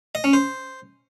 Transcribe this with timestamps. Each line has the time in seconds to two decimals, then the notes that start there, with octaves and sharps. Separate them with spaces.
0.15 D#5
0.24 C#4
0.33 C5